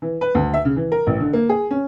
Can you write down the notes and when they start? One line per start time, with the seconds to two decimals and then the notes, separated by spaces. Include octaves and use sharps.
0.02 E3
0.21 B4
0.35 D2
0.54 E5
0.65 C#3
0.76 E3
0.92 A#4
1.07 A1
1.20 D3
1.33 A#3
1.49 G#4
1.71 C#4